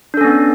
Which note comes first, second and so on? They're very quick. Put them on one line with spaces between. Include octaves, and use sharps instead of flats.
D4 A4 C#4 B3